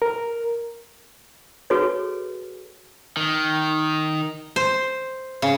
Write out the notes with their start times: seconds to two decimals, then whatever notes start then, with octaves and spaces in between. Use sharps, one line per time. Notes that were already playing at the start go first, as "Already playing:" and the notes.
0.02 A#4
1.70 F#4 G#4 A4 B4 C#5
3.17 D#3
4.56 C5
5.42 C#3